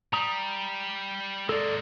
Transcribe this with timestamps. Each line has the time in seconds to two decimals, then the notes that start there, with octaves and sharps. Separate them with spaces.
0.13 G3 A#5 D#6
1.49 G#3 A#3 A4 D5